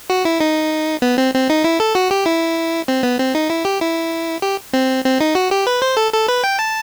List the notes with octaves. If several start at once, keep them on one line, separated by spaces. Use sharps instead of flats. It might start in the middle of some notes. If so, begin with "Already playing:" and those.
F#4
E4
D#4
B3
C4
C4
D#4
E4
A4
F#4
G4
E4
C4
B3
C4
D#4
E4
G4
E4
G4
C4
C4
D#4
F#4
G4
B4
C5
A4
A4
B4
G5
A5